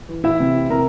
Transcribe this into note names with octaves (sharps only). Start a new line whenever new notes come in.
E3
E4 E5
C3
C3 A#4 A#5